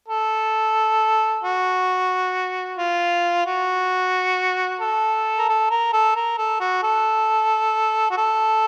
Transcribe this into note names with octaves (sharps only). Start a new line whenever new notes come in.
A4
F#4
F4
F#4
A4
A#4
A4
A#4
A4
A#4
A4
F#4
A4
F#4
A4